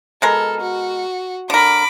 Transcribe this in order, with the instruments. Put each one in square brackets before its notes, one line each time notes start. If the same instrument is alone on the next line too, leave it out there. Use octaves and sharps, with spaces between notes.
[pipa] B2 G#3 A#4 [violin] A4
[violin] F#4
[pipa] D3 A#4 [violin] B5 D6